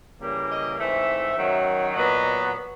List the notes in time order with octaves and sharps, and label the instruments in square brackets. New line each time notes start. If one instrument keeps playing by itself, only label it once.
[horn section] C#3 E3 G3 A#3
D#5
G#2 E3 A3 C4 E5
F#2 D#3 F#3
A#2 F#3 B3 D#5